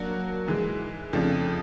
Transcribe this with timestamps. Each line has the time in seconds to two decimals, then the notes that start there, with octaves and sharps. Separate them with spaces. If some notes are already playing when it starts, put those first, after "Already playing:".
Already playing: F#3 A#3 D4 F#4 A#4
0.48 G#2 E3 G#3
1.13 F2 C#3 F3 A3 D4